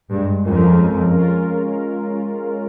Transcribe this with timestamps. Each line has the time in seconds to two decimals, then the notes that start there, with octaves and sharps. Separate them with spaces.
0.11 G2 G#3
0.45 F2 C#4 F4 A#4
0.78 G#3
1.12 C#4 F4 A#4